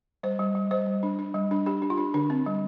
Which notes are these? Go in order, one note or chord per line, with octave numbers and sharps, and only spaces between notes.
G3 C5
G3
G3
G3 C5
G3
D4
D4
G3
D4
D4 G4
D4
F4
D4
D3 D4
C4
G3